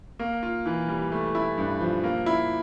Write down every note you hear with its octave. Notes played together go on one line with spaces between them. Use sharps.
A#3
F4
E3
G3
A3
E4
G2
F3
A#3
E4